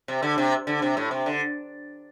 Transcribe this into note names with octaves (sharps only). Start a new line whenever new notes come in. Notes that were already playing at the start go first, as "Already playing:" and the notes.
C3
D3
C3
D3
C3
A2
C3
D3